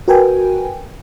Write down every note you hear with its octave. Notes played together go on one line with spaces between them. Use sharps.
F#4 A#4 B4 G5 G#5